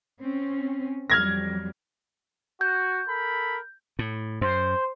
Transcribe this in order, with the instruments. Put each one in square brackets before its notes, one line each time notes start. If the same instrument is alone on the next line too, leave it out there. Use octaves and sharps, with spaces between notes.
[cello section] C4 C#4
[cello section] F2 F#3 G3 [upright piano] F6 G#6 A#6
[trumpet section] F#4 [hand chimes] G6
[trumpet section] A4 A#4 B5
[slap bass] A2
[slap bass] F#2 [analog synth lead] C5